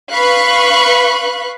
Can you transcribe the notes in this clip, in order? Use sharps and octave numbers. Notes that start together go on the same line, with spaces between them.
B4 F5 B5 C#6 F#6